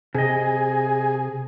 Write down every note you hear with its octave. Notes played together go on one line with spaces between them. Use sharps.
C3 G#4 D#5